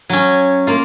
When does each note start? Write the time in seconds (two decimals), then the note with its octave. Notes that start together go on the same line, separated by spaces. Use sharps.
0.10 F#3 C#4
0.67 A#3 F4